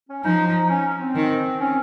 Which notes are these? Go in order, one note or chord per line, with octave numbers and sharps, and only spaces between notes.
C#4
F3 D#4
D#4
C#4
C4
D#3
C#4